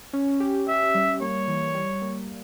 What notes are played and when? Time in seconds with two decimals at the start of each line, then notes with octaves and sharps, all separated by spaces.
0.13 C#4
0.40 G4
0.67 C#4 E5
0.95 G3
1.21 A#3 C#5
1.48 E3
1.74 G3
2.02 A#3